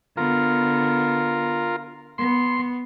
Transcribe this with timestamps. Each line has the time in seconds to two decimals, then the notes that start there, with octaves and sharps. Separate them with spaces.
0.17 D3 B3 F4 A#4
2.18 B3 C6